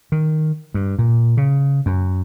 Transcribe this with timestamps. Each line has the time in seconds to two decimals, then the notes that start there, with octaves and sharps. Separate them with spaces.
0.12 D#3
0.74 G2
0.99 A#2
1.37 C#3
1.86 F#2